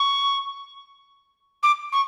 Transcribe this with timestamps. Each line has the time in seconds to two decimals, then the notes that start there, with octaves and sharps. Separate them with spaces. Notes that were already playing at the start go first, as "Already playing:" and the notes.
Already playing: C#6
1.63 D6
1.92 C#6